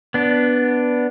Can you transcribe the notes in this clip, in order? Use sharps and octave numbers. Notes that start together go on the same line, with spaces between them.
B3 D4